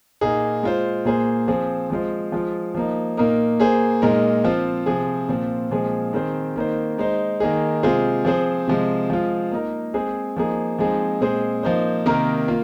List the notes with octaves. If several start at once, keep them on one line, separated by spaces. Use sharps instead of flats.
A#2 A#3 D#4 G#4
G#3 F4 C5
A#2 A#3 G#4 C5
F3 C4 G#4
F3 G#3 F4 C5
F3 G#3 F4
F3 A#3 D#4
A#2 A#3 D#4 A#4
A#3 G#4 C5
A#2 G#3 D#4 A#4
F3 C4 F4
C3 F3 C4 G#4
A#2 F3 C4
A#2 F3 G#3 C4 G#4
D#3 C4 G#4 C5
D#3 A#3 D#4 C5
G#3 D#4 C5
D#3 A#3 D#4 G#4
C3 G#3 F4 G#4 C5
F3 C4 G#4 C5
C3 F3 G#3
F3 G#3 F4
A#3 D#4 A#4
G#3 C4 G#4 C5
F3 A#3 D#4 G#4
F3 G#3 C4 D#4 G#4
A#2 G#3 C4 G#4 C5
F3 A#3 D#4 C5
C3 D#3 A#3 D#4 A#4
A#3 F4